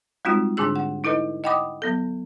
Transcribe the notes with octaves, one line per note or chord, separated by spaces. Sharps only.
G3 G#3 C4 D#4 F4 F#4
G#2 D3 D4 G#4 E6
F#5
D#4 E4 A4 B4 D#5
D#5 F#5 G5 B5 D6 D#6
F#3 B3 A4